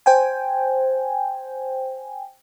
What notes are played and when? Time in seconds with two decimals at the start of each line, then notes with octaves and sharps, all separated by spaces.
0.06 C5 G5 G#5